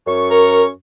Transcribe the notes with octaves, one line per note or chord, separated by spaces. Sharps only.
F#2 C#4 C#6
A#4